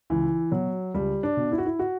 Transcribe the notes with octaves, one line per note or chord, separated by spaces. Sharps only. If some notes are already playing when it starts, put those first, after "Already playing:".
C#2 E3
B2 F#3
C#2 G3
D4
B2
E4
F#4
E4
F#4